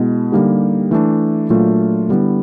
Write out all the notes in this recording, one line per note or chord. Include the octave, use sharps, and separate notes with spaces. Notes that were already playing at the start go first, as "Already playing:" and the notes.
Already playing: B2 G#3 B3 E4
D3 G3 A#3 D#4 G4
E3 A3 D4
A#2 F#3 A3 D4 F4
D3 G3 B3 E4